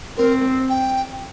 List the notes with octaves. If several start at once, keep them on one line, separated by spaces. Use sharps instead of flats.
C4 A#4
G5